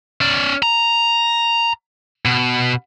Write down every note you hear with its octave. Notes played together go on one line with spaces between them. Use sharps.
C#4 D5
A#5
B2